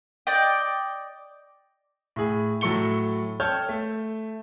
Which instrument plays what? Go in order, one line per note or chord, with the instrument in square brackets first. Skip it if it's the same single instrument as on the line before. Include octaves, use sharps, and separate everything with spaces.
[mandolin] D5 D#5 G5
[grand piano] A2 G#4
A2 F#3 A4 C#6 C#7 G7
A4 C#5 G5 A5 F6 G6
A3